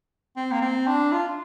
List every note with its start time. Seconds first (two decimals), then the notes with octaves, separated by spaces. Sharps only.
0.36 C4
0.52 A#3
0.61 C4
0.87 D4
1.12 F4